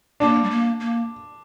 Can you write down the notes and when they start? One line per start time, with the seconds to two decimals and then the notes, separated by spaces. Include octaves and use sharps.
0.20 A#3 D4
0.44 G3
0.50 A#3
0.80 A#3